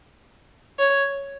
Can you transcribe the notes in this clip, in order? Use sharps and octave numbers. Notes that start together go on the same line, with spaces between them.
C#5